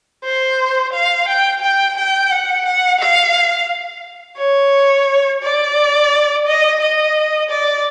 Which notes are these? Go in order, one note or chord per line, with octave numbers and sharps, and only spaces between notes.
C5
F5
G5
G5
G5
F#5
F#5
F5
C#5
D5
D#5
D#5
D5